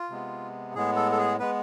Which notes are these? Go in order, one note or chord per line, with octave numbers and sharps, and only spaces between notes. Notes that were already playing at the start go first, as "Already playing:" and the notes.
Already playing: F4
C3 G#3 B3
A2 G#3 B3 G#4
A4
A4
G#4
G#3 B3 B4